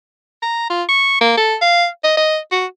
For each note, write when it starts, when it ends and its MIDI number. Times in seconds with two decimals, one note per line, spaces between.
0.42 0.68 82
0.70 0.83 65
0.89 1.16 85
1.21 1.36 58
1.37 1.56 69
1.61 1.87 77
2.04 2.13 75
2.17 2.38 75
2.52 2.66 66